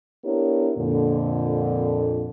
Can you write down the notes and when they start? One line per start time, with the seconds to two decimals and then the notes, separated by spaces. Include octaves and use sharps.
0.24 B3 D4 E4 G4 A#4 C#5
0.78 F2 A#2 D3